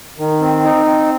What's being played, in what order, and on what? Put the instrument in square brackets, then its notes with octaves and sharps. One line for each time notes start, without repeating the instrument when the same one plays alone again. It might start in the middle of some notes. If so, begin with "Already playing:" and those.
[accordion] D#3
C4
D#4
C4